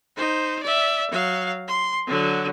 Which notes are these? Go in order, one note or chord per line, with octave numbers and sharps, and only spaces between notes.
D#4 C5
D5 E5
F#3 F5
C6
D3 F#3